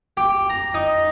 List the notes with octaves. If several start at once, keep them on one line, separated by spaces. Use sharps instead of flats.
G4
A#5
D#4